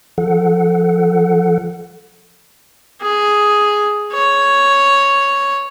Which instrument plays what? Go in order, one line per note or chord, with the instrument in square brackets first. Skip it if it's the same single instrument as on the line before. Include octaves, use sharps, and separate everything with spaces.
[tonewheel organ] F3 A4 F#5
[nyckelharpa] G#4
C#5